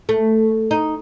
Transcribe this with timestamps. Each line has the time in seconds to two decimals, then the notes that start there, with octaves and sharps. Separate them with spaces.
0.09 A3
0.71 D#4